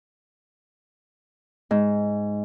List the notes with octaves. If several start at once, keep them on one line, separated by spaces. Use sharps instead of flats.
G#2